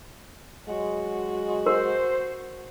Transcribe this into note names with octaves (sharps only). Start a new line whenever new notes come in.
F#3 G#3 F#4
A#4 C5